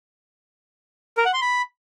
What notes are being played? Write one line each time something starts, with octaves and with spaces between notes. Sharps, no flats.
A#4
F#5
C6
B5